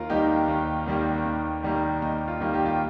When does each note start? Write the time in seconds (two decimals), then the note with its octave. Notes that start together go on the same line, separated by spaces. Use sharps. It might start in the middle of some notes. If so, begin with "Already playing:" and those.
Already playing: D#2 F4 A#4
0.10 D#3 G3 A#3 D#4 G4
0.48 D#2
0.86 D#3 G3 A#3
1.25 D#2
1.63 D#3 G3 A#3
2.02 D#2 D#4
2.28 F4
2.40 D#3 G3 A#3
2.54 G4
2.65 F4